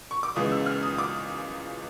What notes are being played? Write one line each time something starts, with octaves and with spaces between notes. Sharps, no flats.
C#6
D6
C#2 C#3 E3 G#3 B3 D#6
E6
F6
D#6
D6